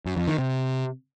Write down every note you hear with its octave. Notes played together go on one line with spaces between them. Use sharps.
F#2
F2
D#3
C3